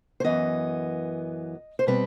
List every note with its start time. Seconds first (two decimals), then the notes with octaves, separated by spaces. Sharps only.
0.20 C5
0.24 F#2 E3 B3 D#5
1.79 C5
1.87 B2 G3 C4 B4